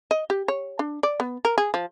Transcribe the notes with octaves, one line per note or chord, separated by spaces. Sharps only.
D#5
G4
C#5
D4
D5
B3
A#4
G#4
F3